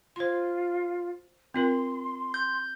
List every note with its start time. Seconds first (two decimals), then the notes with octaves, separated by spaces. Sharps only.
0.16 F4 C5 C6
1.54 C4 F4 A#4 C6
2.34 G6